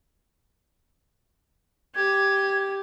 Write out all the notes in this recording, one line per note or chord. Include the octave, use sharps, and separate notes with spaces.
G4 G#6